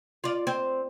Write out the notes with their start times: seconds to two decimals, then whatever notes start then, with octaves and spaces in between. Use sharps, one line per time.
0.24 F4 D5
0.47 C4